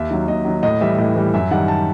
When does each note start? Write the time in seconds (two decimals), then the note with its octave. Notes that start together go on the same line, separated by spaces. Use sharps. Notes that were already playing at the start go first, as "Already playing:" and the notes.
Already playing: D#2 E5
0.11 D#3 F#3
0.28 D#2 D#5
0.45 D#3 F#3
0.63 A2 D#5
0.81 E3 G3 E5
0.98 A2 D#5
1.15 E3 G3
1.34 F#2 E5
1.51 D#3 G3 F#5
1.68 A5